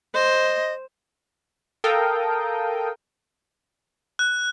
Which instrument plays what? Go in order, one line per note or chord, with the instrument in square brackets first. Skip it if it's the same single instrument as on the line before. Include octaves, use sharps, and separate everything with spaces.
[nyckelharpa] C5 [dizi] D#5
[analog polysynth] A4 A#4 F5 G5 D#6
[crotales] F#6